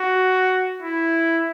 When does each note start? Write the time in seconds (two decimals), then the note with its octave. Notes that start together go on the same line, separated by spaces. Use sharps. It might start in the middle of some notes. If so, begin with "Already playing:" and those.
Already playing: F#4
0.82 E4